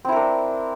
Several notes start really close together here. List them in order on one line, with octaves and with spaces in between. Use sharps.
C4 E4 A#4 D4